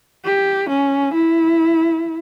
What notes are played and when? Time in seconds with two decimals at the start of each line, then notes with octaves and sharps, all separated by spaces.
0.25 G4
0.69 C#4
1.14 E4